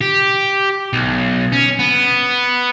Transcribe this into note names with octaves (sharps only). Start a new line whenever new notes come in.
G4
B1
C#4
B3